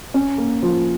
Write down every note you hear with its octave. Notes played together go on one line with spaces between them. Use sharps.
C#4
A#3
F3